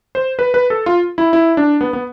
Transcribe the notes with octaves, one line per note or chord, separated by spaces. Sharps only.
C5
B4
B4
A4
F4
E4
E4
D4
B3
B3